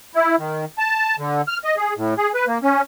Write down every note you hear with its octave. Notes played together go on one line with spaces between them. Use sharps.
E4
D#3
A5
D3
F6
D#5
G#4
A2
G#4
B4
A#3
C#4